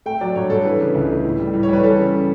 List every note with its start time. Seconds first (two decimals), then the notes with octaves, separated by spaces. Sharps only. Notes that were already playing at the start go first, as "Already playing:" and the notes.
0.06 A3 G5
0.21 F#3 D5
0.35 G2 C#5
0.50 G2 A4
0.65 E3 B4
0.80 C#3
0.95 C#2
1.10 A3
1.24 A2
1.39 G3
1.54 A2
1.63 C#5
1.69 G3 B4
1.83 E3 A4
1.98 C#3